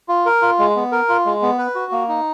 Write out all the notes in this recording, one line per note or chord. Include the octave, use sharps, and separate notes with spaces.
F4
A#4
F4
G#3
B3
A#4
F4
G#3
B3
B4
F#4
A#3
D#4